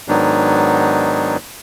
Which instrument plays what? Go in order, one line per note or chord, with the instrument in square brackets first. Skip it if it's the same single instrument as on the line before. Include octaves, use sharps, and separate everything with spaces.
[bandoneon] G#2 D#3 F#3 B3 D4 D#4